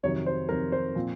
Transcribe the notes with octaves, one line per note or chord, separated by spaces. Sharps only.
F2 C3 D#3 F#3 C#5
C5
F2 C3 D#3 F#3 A#4
C5
A#2 F3 C4